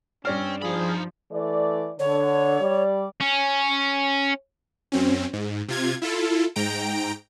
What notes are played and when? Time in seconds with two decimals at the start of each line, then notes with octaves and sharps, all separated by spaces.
0.25 G2 C4 C#4 D5 F6
0.62 F3 D#4 G#4 B5
1.32 E3 A3 D5
1.99 D3 C#5
2.59 G3 D5
3.21 C#4
4.92 F#2 C4 C#4
5.33 G#2
5.69 C3 F4 G#6
6.02 E4 F4 A4
6.56 G#2 G5 A#5 D7